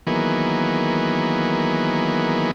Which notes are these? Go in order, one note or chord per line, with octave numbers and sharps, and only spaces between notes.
D#3 E3 F#3 A#3 B3 G#4